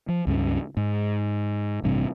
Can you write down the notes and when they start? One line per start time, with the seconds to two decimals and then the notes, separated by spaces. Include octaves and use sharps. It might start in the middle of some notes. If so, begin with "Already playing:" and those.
0.08 F3
0.27 C#2 G2 C#4
0.77 G#2
1.84 A1 G2 C3